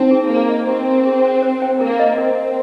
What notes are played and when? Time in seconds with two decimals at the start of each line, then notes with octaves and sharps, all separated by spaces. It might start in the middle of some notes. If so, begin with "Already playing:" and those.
Already playing: C4 D#4
0.11 G#4
0.30 A#3 A#4
0.49 D#5
0.68 C4 G4
0.86 A#4
1.05 G#4
1.25 C5
1.43 C5
1.62 G5
1.81 A#3 A#4
1.99 D#5
2.18 C4 A#4
2.38 D#5